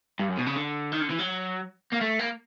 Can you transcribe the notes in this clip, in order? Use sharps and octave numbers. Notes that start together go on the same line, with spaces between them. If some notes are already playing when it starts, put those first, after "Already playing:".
G2
F#2
B2
C#3
D3
D#3
D3
E3
F#3
A#3
A3
A#3